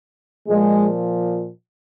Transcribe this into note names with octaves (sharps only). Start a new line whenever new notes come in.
A#2 F3 G#3